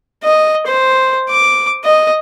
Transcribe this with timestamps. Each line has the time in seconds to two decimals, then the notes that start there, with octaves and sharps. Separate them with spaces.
0.24 D#5
0.67 C5
1.30 D6
1.84 D#5